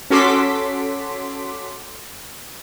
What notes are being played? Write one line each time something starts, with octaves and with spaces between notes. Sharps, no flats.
C#4 F#4 A4 C6 D6 B6